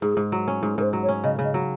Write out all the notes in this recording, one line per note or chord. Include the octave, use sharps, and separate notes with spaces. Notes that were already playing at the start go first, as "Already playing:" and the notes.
G#2 G#4
G#2
F#3
C#4
G#2
G#2 A#4 C5
F#3
C#5
C#4
C#3 D#5
C#3
D#5
F#3